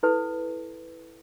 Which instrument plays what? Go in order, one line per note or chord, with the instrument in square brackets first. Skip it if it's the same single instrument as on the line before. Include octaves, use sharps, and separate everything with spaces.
[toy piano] E4 A4 B4